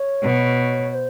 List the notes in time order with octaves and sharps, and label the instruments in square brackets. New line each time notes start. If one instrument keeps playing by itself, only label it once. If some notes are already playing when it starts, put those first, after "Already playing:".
Already playing: [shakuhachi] C#5
[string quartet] B2
[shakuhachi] C#5
C5